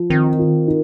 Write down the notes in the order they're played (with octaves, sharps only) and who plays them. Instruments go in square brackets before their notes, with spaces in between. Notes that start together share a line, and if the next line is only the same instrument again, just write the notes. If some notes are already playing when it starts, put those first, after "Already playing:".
Already playing: [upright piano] F3
[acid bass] D#3 [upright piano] C4
[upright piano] F4
D#4